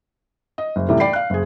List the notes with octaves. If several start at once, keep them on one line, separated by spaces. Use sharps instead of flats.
D#5
F#1
A2 C3 E3 G3 A3
D5 G5 B5 C7
F5 F#6
F#1 G#4